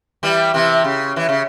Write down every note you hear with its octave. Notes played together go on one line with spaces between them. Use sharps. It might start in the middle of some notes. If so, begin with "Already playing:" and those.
E3 G3
C3 E3
C#3
E3
C#3